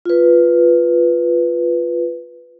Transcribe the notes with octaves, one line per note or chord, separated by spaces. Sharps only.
F4 B4